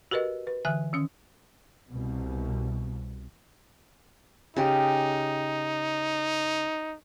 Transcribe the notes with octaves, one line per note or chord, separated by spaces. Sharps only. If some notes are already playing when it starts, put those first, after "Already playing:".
F#4 G4 A#4 B4 D#5
B4
D3 E3 E5 G#5 F#6
D#3 C#4 D#6
C2 B2
C#3 D#4 G4